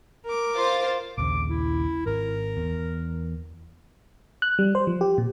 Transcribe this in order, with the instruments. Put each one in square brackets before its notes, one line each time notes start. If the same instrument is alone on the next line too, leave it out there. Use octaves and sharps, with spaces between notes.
[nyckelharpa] A#4 D6
[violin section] F4 C5 A6
[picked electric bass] A#1 D#2 C#3 [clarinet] D6
[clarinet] E4
[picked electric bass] G#1 [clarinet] A#4
[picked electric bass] E2
[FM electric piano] F#6
G3
C5
F3
G4
A#2